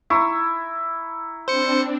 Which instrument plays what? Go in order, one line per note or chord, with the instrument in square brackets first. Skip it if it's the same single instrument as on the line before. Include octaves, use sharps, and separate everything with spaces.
[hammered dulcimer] E4 [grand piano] A#5 C#6
[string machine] C4 D4 [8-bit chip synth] C5 C#7